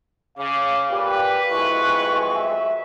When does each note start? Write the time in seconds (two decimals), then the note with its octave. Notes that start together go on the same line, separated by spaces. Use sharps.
0.38 C#3 F5 D6
0.91 A#2 G4 B4
1.51 B1 F2 G#3 E4 C#6
2.35 E5